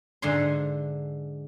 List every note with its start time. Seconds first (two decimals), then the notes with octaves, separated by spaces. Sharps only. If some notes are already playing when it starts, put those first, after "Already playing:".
0.22 G#2 D3 E5 G#5 C6